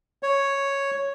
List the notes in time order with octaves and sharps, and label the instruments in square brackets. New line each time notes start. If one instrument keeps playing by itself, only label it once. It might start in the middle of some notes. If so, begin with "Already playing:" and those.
[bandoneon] C#5